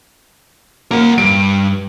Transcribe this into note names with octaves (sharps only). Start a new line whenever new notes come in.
A#3 A#4 F#5
G2 D7